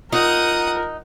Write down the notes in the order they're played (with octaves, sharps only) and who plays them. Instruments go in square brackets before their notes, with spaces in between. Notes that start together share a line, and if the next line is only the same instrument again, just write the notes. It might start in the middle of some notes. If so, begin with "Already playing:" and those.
[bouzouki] D#4 [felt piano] F4 [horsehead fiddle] A#4 [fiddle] F#5 D#6